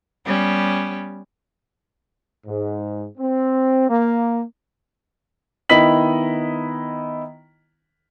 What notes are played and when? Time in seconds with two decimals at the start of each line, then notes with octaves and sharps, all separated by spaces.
0.25 G3 B3 C#4 G4
2.47 G#2
3.18 C4
3.89 A#3
5.69 D#3 B3 E4 D#5 B6 F#7